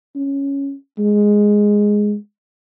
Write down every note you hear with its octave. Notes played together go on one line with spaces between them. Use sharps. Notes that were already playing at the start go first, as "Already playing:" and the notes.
C#4
G#3